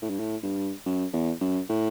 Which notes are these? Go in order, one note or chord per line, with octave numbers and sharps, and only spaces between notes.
A2
G2
A2
G2
F#2
E2
F#2
A2